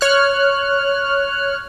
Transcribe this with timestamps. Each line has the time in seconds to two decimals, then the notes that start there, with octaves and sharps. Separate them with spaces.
0.01 C#5 F6 F#6